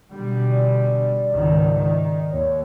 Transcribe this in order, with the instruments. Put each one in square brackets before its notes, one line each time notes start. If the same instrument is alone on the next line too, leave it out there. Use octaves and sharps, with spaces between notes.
[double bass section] B2 D3 G3
[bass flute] D5
[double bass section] C#2 G#2 D#3
D#3
[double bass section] D#2 [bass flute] C#5